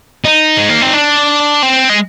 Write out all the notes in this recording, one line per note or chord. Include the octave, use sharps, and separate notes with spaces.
D#4
G#3
A#3
C4
D4
C4
G#3